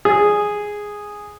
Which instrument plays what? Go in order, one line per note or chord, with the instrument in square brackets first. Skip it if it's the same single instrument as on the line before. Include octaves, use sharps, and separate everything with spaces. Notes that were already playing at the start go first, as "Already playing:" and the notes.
[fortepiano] G#4